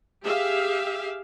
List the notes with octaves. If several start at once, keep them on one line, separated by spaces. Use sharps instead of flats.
G4 G#4 E5 F5